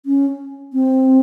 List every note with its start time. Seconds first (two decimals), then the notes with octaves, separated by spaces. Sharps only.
0.06 C#4
0.73 C4